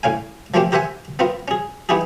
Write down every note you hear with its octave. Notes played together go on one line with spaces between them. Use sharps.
A2 C#4 F5 G#5
F3 A3 A#3 C4 C#4 G4
G4 A#4 C5 E5 F#5 G#5
B3 C4 F4 A#4
C#4 G#4
B3 D#4 E4 G4 G#4